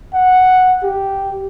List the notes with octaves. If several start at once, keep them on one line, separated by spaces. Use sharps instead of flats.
F#5
G4